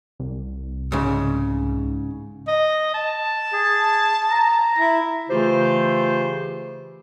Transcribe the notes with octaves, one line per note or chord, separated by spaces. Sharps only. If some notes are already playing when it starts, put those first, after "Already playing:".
C2
G#2 C#3
D#5
A5
G#4
A#5
E4
C#3 E3 A3 F4 G4 C5